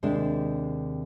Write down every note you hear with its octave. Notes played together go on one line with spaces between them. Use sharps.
D#2 C3 G#3 D4